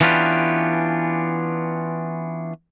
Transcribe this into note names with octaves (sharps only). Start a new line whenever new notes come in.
E3 B3 C#4 D4 F4 G4